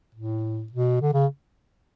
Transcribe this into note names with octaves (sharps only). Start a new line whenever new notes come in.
A2
B2
D3
C#3